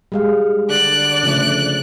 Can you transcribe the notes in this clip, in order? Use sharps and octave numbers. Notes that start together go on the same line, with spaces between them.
G3 G#3 F5
D3 D5 F#6
C#3 F3 A3